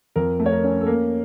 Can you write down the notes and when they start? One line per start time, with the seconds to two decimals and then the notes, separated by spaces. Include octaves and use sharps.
0.16 F2 A#4
0.40 A3
0.46 C#5
0.52 A#4
0.64 C#4
0.81 A4
0.86 A#3 A#4